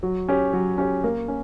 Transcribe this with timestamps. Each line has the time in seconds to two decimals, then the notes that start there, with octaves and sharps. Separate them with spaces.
0.03 F#3
0.29 C#4 G4 C#5
0.53 F#3
0.78 C#4 G4 C#5
1.04 A#3
1.28 C#4